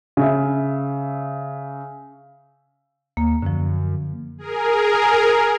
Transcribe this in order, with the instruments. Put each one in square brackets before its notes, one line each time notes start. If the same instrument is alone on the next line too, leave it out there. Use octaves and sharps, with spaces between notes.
[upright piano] C#3 E5
[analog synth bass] D#2 [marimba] A#3
[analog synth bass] F#2 [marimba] D3 F3
[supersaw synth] G#4 A#4